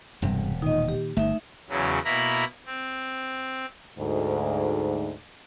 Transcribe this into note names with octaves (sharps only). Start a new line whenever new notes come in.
E1 G2 C3 G3
A#2 D#3 D#4 D#5
G4
G1 A3 D#4 E5
E2 C#3 F#3
B2 A#3 E4 A#5 B5
C4
D2 G#2